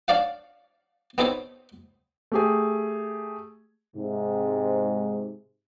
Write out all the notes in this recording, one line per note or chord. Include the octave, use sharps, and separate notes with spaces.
D4 C#5 D5 F5 F#5
B3 C4 D#4 A4 C5 C#5
A3 G4 G#4
G#2 C3